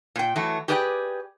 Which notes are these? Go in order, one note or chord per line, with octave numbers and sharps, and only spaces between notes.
A#2 G5
E3 F#3 A3
G4 G#4 B4 D5 E5 G5